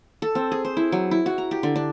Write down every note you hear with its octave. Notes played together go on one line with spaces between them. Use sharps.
A4
C4
G#4
C5
E4
F#3
E4
F#4
A#5
G4
D3
D4